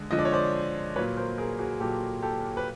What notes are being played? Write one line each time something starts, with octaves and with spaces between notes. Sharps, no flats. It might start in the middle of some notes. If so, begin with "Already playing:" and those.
Already playing: D3 G#3
D3 F3 G#3 D#5
D5
C#5
C5 D5
A#2 F#3 B4 C#5
A#4 C5
G#4 A#4
F#4 G#4
A#2 F#3 G4 A4
G4 A4
B4